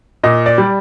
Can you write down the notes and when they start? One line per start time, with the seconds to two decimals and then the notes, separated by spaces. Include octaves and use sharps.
0.23 A#2 D#5
0.46 D5
0.58 G3